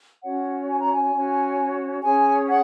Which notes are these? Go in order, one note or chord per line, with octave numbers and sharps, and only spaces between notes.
C#4 F#4 C#5 F#5
G#5
A#5
G#5
C#4 F#4 C#5
C#4 G#4 C#5 G#5
F#5